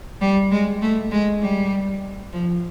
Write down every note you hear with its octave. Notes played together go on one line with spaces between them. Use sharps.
G3
G#3
A3
G#3
G3
F3